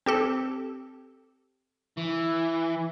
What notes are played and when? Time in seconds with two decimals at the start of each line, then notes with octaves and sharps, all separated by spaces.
0.06 C4 G4 A4
1.97 E3